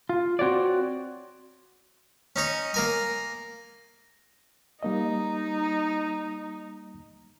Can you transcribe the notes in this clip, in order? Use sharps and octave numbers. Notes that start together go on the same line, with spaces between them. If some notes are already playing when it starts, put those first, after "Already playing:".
F4
C4 F#4 C#5 D5
C#4 D#4 C#5
A#3 A#4 G#5
G3 A#3 D#4 D#5